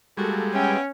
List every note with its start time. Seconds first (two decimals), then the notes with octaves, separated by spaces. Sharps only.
0.17 G3 G#3 A#3 F#4 A4
0.54 B3 C#4 E5 G5